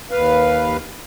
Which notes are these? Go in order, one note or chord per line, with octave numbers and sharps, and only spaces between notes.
D#2 B4 F5